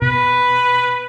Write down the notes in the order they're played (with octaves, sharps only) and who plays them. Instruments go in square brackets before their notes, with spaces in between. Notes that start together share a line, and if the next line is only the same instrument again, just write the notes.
[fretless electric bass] B2 [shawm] B4